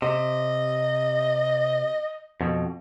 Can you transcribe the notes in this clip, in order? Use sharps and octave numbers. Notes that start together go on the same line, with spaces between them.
C3 D#5
F2 B2